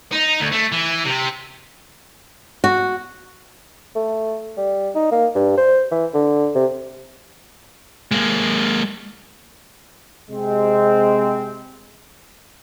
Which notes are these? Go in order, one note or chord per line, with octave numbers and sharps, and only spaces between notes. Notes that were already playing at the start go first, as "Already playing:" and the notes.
D#4
D2
A3
E3
C3
F#4
A3
G3
D#4
A#3
G2
C5
E3
D3
C3
G#3 A#3
C3 G#3 C4